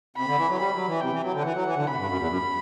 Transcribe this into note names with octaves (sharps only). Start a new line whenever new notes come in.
C3 B5
D3
E3
F#3
G3 B5
F#3
E3
C3 G5
E3
F#3
D3
E3 F#5
F#3
E3
D3
C3 B5
G2
F#2
E2
F#2